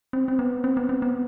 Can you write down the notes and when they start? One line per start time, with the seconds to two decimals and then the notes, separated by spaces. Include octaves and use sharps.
0.13 C4
0.28 C4
0.39 B3
0.64 C4
0.77 B3
0.89 C4
1.02 B3